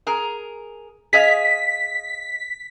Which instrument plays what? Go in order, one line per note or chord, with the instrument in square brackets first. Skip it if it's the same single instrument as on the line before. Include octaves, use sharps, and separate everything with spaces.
[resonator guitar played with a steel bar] G#4 A#4
[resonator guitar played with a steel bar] G#4 D#5 F5 [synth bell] B6